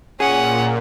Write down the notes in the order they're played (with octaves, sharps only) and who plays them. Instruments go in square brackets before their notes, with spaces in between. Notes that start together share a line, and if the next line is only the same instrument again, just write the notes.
[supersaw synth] A#2 [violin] C#4 F#5 [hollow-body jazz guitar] G#4